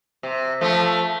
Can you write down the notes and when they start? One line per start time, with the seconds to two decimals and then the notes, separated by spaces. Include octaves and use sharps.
0.23 C3
0.61 F3 A3